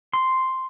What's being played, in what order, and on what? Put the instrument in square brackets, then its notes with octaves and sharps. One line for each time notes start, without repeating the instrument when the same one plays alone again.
[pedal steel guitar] C6